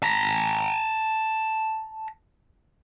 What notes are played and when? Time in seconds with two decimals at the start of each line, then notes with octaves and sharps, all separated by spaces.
0.03 A5 A#5